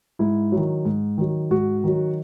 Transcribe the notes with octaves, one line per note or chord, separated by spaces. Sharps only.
G#2 E4
D#3 F#3
G#2
D#3 F#3
G#2 F#4
D#3 F#3